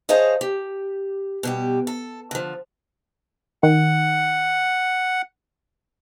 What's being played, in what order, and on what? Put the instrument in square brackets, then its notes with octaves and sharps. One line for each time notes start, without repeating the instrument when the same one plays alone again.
[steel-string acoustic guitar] G#4 C5 C#5 D#5 F5 A5
G4
B2 G3 G4
A4
D3 F3
[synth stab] D#3 [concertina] F#5